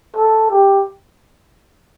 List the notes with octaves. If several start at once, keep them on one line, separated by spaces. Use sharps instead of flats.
A4
G4